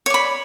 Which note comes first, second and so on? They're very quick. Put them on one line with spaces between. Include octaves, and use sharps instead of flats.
C#5 D5 B5